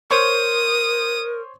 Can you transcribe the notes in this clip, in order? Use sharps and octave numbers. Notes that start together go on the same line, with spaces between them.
A#4 C5 C#5 C#6 D#6